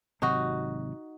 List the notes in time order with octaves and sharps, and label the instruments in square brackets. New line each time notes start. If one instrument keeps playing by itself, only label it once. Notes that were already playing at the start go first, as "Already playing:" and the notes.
[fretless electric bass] G#1 C3 F#3 [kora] D#4 F#4